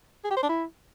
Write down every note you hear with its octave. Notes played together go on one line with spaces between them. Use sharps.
G#4
G4
C5
D4
E4